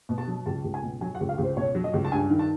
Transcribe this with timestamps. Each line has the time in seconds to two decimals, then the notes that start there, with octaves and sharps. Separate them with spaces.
0.09 B2
0.18 A5
0.27 F#3
0.46 C#2 A5
0.64 C#2
0.74 G#5
0.83 B2
1.01 F#3 G#5
1.15 F#5
1.20 C#2
1.29 F5
1.38 C#2
1.43 C5
1.57 B2 C#5
1.75 F#3
1.84 D#5
1.93 C#2
2.05 A5
2.12 G2 G#5
2.30 D#3
2.39 A5